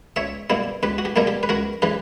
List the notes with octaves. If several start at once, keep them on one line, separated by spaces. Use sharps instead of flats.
C#2 C#5 E5
B2 G3 A#3 E4
C#2 G4 B4
F#4
G4
B2 G3 A#3 E4 A#4
G4
B4
C#2 F#4 A#4
C#3 E3 G4 B4